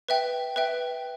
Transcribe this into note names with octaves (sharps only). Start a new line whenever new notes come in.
B4 E5 G5
B4 E5 G5